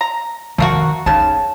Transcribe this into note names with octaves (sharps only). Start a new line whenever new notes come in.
A#5
D#3 A3 A#3 F#4
C#3 C#4 D#4 A5